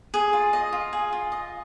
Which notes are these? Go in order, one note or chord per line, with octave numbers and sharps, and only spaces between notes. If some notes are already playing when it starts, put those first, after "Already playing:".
G#4
F4
D#5
F4
G#4
F4
D#5